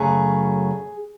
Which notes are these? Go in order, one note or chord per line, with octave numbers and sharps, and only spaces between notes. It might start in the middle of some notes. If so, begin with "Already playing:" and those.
Already playing: F#2 C#3 F#3 A3 G#4